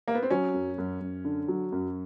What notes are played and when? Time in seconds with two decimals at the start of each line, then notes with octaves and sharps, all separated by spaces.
0.08 A#3
0.15 B3
0.23 C4
0.30 F#3 C#4
0.54 F#2
0.78 F#2
1.01 F#2
1.25 D3
1.48 F#3
1.72 F#2